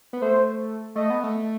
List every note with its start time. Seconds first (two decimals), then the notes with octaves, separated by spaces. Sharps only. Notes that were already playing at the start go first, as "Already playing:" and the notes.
0.13 B3
0.21 A3 C5
0.95 A3 D#5
1.10 B3
1.23 A3